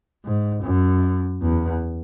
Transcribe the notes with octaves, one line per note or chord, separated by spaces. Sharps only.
G#2
F#2
E2